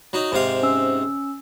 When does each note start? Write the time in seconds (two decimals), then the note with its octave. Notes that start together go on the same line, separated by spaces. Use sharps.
0.13 F#3 D#4
0.32 G#2 C3 F5
0.63 C#4 E6